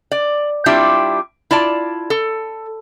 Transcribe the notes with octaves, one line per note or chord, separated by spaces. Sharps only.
D5
G3 C4 D4 E4 F4 G4
E4 F4 D5 A5
A4